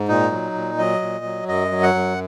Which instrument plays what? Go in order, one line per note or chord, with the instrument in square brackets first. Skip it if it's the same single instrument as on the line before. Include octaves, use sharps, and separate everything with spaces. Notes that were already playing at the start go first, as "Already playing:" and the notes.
Already playing: [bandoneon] G#2
A#2 D#4
F#3
A#2
F#3 D#5
A#2
F#3
F#2 D#5
F#3
F#5
F#2